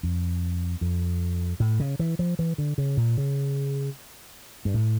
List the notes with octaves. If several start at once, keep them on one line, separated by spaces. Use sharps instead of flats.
F2
F2
A2
C#3
E3
F3
E3
D3
C#3
A#2
C#3
G2
A2